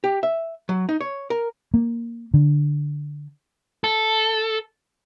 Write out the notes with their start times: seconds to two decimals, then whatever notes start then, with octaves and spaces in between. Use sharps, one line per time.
0.04 G4
0.23 E5
0.69 F#3
0.89 D#4
1.01 C#5
1.30 A#4
1.74 A#3
2.34 D3
3.84 A4